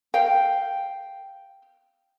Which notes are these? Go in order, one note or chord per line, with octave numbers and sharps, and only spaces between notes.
F5 G5